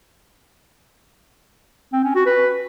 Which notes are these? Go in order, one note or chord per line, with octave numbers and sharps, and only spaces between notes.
C4
C#4
F#4
B4